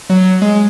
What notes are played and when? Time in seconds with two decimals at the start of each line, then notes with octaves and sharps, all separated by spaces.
0.10 F#3
0.42 G#3